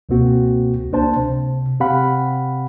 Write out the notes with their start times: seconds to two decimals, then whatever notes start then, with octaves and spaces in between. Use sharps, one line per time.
0.09 C#2 B2 A#3 C4 F#4
0.92 C#2 A#3 D4 C5 A5
1.17 C3
1.80 C3 C4 G4 F5 F#5 B5